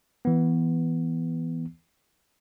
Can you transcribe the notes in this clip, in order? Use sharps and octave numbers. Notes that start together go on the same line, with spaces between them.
E3 B3